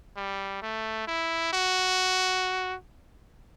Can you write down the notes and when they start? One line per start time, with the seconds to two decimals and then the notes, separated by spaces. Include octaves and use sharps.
0.16 G3
0.62 A3
1.07 E4
1.53 F#4